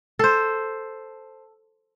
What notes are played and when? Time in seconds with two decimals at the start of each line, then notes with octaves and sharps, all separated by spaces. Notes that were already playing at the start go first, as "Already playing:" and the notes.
0.19 A4 C5